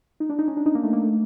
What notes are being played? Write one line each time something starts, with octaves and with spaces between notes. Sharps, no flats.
D#4
D4
D#4
C#4
D4
D#4
A#3
A3
A#3
A3